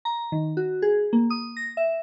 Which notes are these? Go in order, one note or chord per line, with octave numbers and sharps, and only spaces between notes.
A#5
D#3
F#4
G#4
A#3
D#6
A#6
E5